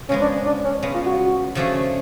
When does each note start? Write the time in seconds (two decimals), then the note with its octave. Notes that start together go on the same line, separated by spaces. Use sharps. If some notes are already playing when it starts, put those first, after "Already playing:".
0.09 C#3 F3 G#3 B3 C#4
0.21 D4
0.46 D4
0.65 C#4
0.83 C#3 G#3 B3
0.95 F4
1.06 F#4
1.55 C#3 F3 A3 D4 G#4